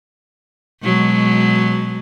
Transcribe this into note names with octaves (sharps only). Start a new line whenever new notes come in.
B2 F#3 G#3